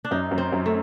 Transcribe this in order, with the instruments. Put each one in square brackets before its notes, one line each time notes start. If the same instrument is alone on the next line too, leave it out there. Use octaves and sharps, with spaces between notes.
[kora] D4
[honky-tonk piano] F#2 [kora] D#4
[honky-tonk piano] F#2
[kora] C4
[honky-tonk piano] F#2
[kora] A3